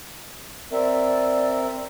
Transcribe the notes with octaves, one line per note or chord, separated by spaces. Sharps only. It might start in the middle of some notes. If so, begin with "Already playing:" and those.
C4 A#4 D5 E5